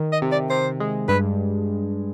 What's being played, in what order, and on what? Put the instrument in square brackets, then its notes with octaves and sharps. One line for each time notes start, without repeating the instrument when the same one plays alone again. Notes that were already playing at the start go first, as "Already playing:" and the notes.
Already playing: [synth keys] D#3
[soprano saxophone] D#5
[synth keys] C3
[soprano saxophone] D5
[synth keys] C3 [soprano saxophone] C5
[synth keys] G#3
[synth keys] G2 [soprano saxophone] B4